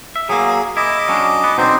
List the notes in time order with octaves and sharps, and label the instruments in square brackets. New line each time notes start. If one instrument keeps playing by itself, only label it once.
[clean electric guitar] E5
[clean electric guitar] F#3 A#3 [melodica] G#4
[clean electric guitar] E4 [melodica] D#5 D6
[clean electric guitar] F#3 C#4 D4
B3
[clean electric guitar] B2 D3 F#3 [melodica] C4 D#4 C5